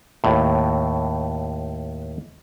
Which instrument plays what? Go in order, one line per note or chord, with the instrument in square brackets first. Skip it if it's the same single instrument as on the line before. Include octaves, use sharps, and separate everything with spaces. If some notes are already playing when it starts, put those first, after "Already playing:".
[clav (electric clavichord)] D#2 A2